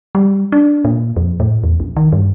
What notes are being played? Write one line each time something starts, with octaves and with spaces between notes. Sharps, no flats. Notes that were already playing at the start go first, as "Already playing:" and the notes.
G3
D4
A#2
F2
A2
E2
A#1
D#3
G2